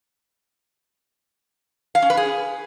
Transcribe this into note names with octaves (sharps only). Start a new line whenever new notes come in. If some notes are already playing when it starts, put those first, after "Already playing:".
F5
C#4
B4
G#4